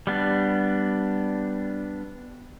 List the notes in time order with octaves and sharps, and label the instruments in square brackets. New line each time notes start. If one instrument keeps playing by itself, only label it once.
[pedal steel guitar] G3 B3 D4